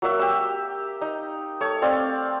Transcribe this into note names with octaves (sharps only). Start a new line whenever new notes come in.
F#3 A#3 F#4 E5
G4 E6
D#4 D#5
A3 C#5
C4 D5 F5